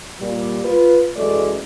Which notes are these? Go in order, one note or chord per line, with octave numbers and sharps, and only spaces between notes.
A#2 G3
F4 B4
F#2 E3 G#3 A3 D5